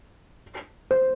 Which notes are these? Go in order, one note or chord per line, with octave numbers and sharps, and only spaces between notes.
C5